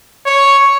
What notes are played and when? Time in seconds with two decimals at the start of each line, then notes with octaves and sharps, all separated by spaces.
0.26 C#5